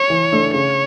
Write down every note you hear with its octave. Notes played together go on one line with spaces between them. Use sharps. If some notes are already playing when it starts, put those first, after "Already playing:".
Already playing: C#5
E3
A3 D4
C#3 C#5